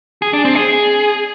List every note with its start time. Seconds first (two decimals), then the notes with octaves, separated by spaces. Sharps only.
0.22 G#4
0.33 D4
0.45 C4
0.56 G#4